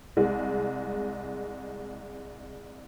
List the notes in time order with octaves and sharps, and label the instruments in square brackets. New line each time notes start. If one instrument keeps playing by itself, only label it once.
[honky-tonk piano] C2 G#3